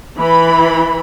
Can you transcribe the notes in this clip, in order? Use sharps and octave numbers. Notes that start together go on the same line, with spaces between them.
E3 B5